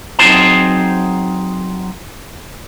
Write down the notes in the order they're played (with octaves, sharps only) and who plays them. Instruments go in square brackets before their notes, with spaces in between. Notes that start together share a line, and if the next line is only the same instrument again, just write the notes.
[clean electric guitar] F#3 C4 D#4 G#4 C5 A5